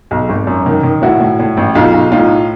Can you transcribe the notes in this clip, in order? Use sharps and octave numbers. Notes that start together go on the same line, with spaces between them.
B1
G#1
F#2
D#3
D#3
A2 E4 F#4
A2
A2
A1
B1 D#4 F4
B1
A2 D#4 F4